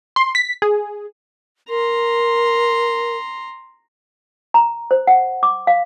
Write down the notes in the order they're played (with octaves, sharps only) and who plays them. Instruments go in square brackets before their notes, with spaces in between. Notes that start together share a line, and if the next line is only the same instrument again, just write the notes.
[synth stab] C6
B6
G#4
[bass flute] A#4 [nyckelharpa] A#5 C6
[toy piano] A#5
C5
F#5
D6
F5